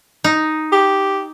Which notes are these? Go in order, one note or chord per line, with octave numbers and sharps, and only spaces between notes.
D#4
G4